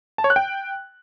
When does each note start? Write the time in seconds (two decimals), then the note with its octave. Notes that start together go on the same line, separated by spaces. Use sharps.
0.18 A5
0.24 C#5
0.30 F#6
0.36 G5